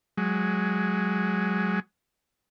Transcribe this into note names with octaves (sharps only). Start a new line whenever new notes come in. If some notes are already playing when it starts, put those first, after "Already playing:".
F#3 G#3